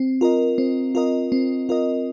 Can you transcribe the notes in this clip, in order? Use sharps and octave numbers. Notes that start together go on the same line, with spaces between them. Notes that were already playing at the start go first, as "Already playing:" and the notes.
Already playing: C4
F4 A#4 D#5
C4
F4 A#4 D#5
C4
F4 A#4 D#5